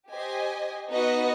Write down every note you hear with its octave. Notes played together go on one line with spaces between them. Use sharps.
G4 C5 D#5 G#5
B3 D#4 F#4 B4 D#5